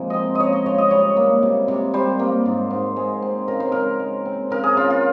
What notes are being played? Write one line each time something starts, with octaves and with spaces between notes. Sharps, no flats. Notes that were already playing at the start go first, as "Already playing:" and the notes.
Already playing: C3 F3 G#3 A#3
C4 D#5
C#3 C#5 D#5
D#5
C#3 C#5
D#5
G3 C#5
A#3
C3
C3
G3 C5
A#3
G#2
G#2
G#3
C4
C#3 A#4
C5
C#3 A#4
G#3
C4
C#3 A#4
G#4
C#3 F4
F4